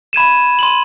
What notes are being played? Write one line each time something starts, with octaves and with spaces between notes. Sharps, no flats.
B5 G#6 D#7 E7
C6 D#7 F#7